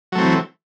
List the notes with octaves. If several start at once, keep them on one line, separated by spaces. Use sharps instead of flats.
E3 F#3 A3 C4